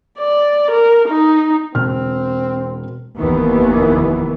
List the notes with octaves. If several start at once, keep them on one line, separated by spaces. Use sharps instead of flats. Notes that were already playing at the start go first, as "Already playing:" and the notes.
D5
A#4
D#4
E1 C4 F6
F1 D#2 D#3 E3 B3